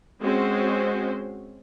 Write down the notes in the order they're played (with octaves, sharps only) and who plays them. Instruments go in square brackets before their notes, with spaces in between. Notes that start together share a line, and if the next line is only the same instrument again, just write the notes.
[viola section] G#3 C4 C#4 F#4 C5